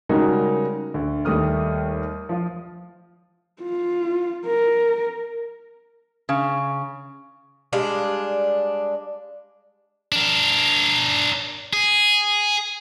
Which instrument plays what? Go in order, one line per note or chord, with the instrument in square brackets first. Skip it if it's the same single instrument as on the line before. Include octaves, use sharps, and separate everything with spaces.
[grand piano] C#3 G3 G#3 D#4 F#4 A#4
D2
D#2 G3 A3 D#6 F6
F3 F4
[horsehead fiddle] F4
A#4
[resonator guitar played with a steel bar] C#3
[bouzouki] G3 G#3 D4 F5
[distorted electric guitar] D4 A#4
G#4